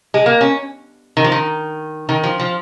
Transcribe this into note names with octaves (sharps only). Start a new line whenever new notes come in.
G#3
A#3
C#4
D#3
F3
D#3
D#3
F3
F3